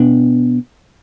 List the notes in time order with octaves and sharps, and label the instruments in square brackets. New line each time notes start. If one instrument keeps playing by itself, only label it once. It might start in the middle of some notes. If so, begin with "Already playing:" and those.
Already playing: [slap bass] B2 B3 D4